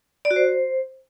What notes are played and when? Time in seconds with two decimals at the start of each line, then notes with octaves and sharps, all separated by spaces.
0.25 D5
0.31 F#4
0.36 C5